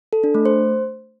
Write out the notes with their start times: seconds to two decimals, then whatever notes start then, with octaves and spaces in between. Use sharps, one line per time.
0.13 A4
0.24 D4
0.35 A3
0.45 C5